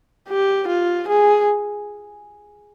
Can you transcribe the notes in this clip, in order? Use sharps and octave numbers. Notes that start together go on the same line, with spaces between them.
G4
F4
G#4